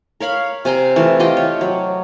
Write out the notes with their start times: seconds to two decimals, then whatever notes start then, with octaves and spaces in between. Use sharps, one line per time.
0.20 A#4 C#5 F5 B5
0.65 C3 G#5 A#5 C6
0.96 E3 A3 F4
1.20 F4 G4 D#5 G5
1.37 C#5
1.61 F#3